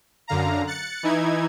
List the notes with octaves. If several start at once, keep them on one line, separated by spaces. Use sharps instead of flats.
F#2 D3 F5 A#5
F#6 A6 C#7
E3 D#4 E4 G#6